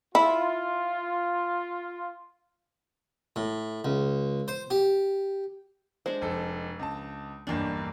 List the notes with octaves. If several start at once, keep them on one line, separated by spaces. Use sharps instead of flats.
E4 F4
A2
C#2
C5
G4
G#3 D4 C5
F1 A4
C#2 A5
B1 E2 G2 A#3 D4